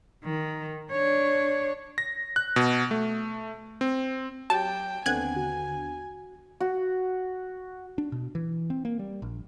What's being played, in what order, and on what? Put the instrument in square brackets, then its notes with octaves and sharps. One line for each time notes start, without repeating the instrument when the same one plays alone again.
[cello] D#3
D4 C#5
[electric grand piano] A#6
F#6
B2
A3
C4
[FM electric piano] F#3 G4 [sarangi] G5 [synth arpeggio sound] A5
[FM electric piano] D#2 D3 B3 [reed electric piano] C4 F#5 [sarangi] G#5 [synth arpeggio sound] F#6 G#6
[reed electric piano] F#4
[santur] F#4
[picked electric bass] D4
B2
E3
C4
A#3
G3
A#1